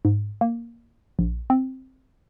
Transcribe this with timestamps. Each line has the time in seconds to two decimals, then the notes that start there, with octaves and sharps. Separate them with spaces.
0.05 G#2
0.41 A#3
1.19 A#1
1.50 C4